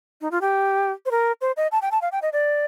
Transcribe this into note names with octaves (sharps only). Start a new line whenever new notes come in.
D#4
F4
G4
C5
A#4
C5
D#5
A5
G5
A5
F5
G5
D#5
D5